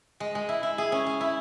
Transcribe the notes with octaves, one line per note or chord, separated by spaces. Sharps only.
G#3
G#3
E4
E4
G#4
C#4
G#4
E4